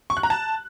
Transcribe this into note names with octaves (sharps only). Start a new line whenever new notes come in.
C#6
F#6
A#5
A5